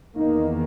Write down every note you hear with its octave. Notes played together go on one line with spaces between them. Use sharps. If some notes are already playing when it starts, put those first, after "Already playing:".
E2 D#3 A#3 D#4